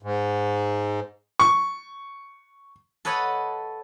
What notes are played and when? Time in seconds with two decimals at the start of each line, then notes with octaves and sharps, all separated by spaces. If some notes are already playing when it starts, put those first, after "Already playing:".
0.02 G#2
1.39 C#6
3.05 A4 B4 C#5 D#5 F#5